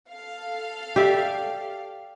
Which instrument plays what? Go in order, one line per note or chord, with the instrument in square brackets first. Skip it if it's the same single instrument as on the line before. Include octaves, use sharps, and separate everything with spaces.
[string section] A4 F5
[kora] G4 D5 E5